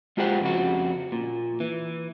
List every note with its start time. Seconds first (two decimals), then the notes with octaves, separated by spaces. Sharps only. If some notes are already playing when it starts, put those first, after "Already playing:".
0.17 G#3 F4 G4 G#4 C5 F#5
0.41 F2 C#3 F#4
1.12 A#2
1.60 E3